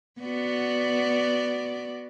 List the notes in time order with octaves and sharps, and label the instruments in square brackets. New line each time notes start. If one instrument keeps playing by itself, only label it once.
[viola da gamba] B3 F#4 D5